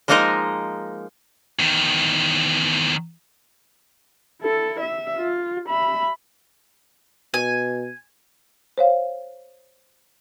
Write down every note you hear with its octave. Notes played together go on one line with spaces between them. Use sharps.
F3 G#3 A#3 D#4 A#4 D#5
E2 D#3
E4 A4
E5
F4
E5 B5
B2 G#5
C5 C#5 F5